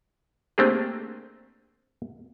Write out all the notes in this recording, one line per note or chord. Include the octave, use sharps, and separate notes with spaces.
A3 A#3 C4 D4 G4 G#4